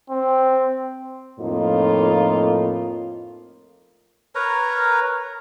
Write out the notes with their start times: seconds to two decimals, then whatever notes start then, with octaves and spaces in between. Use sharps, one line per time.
0.10 C4
1.39 F2 A2 A#3 D#4 F4
4.35 A#4 B4 C#5 A#5